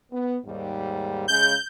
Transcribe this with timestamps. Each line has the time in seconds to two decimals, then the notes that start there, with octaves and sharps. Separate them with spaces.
0.12 B3
0.45 D#2 G#2 G3
1.28 C#3 G#3 G6